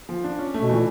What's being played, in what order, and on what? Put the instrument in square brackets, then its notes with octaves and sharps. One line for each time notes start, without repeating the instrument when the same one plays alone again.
[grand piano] F3
D4
C#4
A3
[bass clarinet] B2
[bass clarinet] A#2 [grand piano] E3